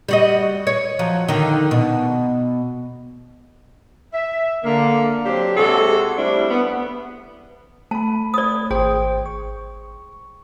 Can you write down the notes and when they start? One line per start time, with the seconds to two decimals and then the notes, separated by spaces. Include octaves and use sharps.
0.09 G3 F#4 D#5
0.67 C#5
0.99 F3 F#3
1.28 D3 D#3
1.71 B2
4.13 E5
4.63 D3 A#3
5.25 F#3 C4 D4 G4
5.56 C3 G#3 F#4 G#4 A4
6.17 G3 A3 C4 D4 E4
6.50 B3
7.91 A3 A5 B5
8.34 D5 D#6
8.71 G#1 G#4 C5 G5
9.26 C#6